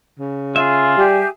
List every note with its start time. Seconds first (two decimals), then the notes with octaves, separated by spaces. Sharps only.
0.20 C#3
0.56 F4 G#4 E5
0.97 G3 G4 G#5